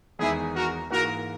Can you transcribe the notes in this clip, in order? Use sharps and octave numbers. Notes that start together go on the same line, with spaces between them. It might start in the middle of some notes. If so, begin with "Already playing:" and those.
E2 D#3 G#3 D#4 E4 G#4
F#4 A#4
G#2 E3 A#3 F#4 A#4